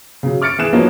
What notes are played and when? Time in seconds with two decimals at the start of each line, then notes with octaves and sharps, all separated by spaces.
0.23 C#3 F#3
0.42 D6 F6 A6 C#7 D7
0.58 E3 G#4 F#6 E7
0.73 F3 F#3 A#3 B3 C#4 D#4